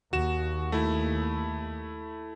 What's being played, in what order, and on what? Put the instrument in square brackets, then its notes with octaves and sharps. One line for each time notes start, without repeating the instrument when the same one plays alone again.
[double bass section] D#2 [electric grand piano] F#4 E7
[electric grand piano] A3 E4